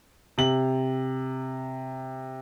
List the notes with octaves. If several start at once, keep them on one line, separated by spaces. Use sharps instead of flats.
C3 F#7